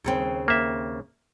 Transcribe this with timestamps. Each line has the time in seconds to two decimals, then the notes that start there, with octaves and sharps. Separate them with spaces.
0.04 D#2 C#3 C4
0.48 A#3 E5